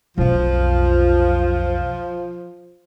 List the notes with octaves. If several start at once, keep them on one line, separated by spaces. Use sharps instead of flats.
B1 F2 F3